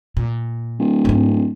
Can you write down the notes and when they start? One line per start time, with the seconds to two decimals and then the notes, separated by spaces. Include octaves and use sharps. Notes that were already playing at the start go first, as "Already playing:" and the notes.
0.17 A#2
0.79 D1
1.05 G#2 C4